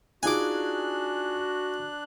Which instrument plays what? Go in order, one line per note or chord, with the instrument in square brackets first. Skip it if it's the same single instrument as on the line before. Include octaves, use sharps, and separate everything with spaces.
[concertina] D4 F#6 [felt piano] D#4 F4 G#4 [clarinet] F#4 [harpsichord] G#5 D6